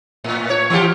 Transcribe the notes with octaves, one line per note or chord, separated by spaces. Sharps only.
A2
C#5
E3 F4 G4